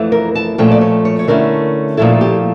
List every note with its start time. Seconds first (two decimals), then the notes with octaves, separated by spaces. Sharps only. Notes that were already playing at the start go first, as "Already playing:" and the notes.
Already playing: F2 E3 A3 E4
0.12 A#4
0.35 A5
0.58 A#2 F3 A3 C#4 G5
0.71 D5
0.81 C#5
1.05 C#5
1.19 C#5
1.27 D3 A3 C#4 E4 A#4
1.97 A#2 F3 A3 E4 A4
2.21 G4